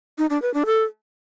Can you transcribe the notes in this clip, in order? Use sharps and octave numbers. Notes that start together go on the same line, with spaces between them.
D#4
D4
B4
D4
A4